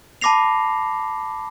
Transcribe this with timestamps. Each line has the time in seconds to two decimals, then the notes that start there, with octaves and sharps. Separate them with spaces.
0.21 A5 B5 D6 A#6 C7 F7